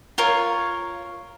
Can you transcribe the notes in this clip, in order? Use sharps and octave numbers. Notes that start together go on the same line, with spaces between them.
F4 A#4 C#5